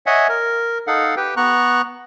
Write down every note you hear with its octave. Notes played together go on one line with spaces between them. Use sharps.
C#5 D#5 E5 F#5 G#5
A#4
D#4 A4 F5 F#5
G4 B4 G5
B3 A#5 C#6 F#6